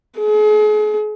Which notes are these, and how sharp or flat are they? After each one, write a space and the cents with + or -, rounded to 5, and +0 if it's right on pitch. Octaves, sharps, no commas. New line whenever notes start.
G#4 +40